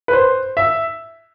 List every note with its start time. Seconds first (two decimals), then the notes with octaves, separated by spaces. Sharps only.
0.08 B4
0.13 C5
0.57 E5